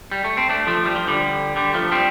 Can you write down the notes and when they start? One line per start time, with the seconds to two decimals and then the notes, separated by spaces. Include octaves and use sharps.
0.11 G3
0.24 A3
0.37 C4
0.49 A3 D4
0.67 F3 A3
0.85 G3
0.96 F3
1.07 D3 G3
1.56 D3 G3
1.74 F3 A3
1.91 G3 C4